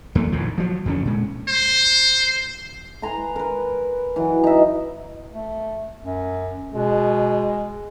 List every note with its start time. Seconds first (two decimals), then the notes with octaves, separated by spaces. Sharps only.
0.15 E2 A3 A#3
0.32 A#1 A2 D#3 F3
0.58 F3 F#3
0.85 F2 D3 C#4
1.05 A#2 G#3
1.48 C5
3.02 B4 G#5 A#5 C6
3.36 A#4 B4
4.16 E3 F#3
4.44 D#4 E5
5.33 A3
6.03 F#2
6.74 B2 G#3